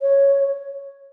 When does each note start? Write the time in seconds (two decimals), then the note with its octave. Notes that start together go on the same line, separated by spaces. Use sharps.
0.02 C#5